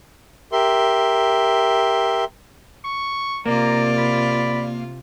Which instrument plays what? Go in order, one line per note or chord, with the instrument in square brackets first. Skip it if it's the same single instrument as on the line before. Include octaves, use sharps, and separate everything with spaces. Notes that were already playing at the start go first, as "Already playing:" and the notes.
[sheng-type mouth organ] G4 A#4 E5 C6
[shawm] C#6
[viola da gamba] C3 F4 [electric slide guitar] A#3 [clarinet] D5 [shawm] A#5
[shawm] B5